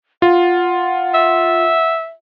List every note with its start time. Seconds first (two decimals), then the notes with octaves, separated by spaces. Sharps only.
0.22 F4 F#5
1.14 E5